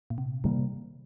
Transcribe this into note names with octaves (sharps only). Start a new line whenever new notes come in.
A#2
C3
C3 D#3 G3 A#3